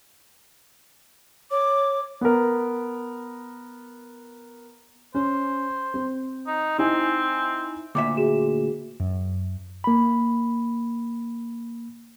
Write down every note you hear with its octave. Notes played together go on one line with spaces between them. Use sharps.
C#5 D6
B3 A#4
C#4 C5
C4
D#4
C4 D#4 E4 G#5
D2 A#2 E5 D6
F#4 G#4 E7
F#2
A#3 B5